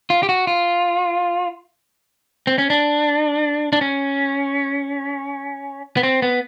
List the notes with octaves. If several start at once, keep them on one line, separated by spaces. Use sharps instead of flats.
F4
G4
F#4
F4
C4
C#4
D4
D4
C#4
B3
C4
B3